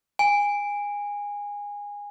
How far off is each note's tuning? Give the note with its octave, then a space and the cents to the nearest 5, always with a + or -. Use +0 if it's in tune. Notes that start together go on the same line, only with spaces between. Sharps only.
G#5 -20